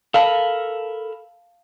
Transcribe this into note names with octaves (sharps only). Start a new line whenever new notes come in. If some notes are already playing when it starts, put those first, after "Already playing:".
A4 A#4 F5 A5 B5